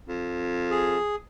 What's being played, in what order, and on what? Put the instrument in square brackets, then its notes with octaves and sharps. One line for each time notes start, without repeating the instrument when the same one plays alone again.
[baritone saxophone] F2
[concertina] G#4